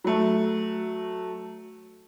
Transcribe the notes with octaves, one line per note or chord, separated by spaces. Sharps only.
F#3 A3